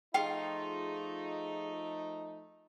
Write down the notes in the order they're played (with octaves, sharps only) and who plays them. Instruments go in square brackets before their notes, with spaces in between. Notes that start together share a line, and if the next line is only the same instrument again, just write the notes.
[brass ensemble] F3 A3 D#4 [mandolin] F4 [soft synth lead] G#4 [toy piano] G5